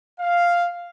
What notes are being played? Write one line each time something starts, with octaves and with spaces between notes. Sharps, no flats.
F5